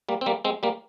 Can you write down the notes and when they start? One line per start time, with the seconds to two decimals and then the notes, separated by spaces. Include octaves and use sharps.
0.09 G3 A#3
0.21 C4
0.26 G3 A#3
0.45 G#3 C4
0.63 G3 A#3